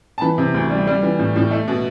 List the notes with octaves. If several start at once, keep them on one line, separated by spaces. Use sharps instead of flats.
A5
E3 B5
C3
D2
G3
G3
E3
A2
A2
A3
B2